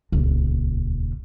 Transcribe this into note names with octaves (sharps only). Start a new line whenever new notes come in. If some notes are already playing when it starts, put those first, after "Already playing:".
D#1 C#2